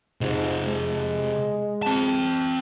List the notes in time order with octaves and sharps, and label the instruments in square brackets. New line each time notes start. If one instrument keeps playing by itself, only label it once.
[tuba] G#2 [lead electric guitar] C3 F4
[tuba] G#3
[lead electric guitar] C4 A5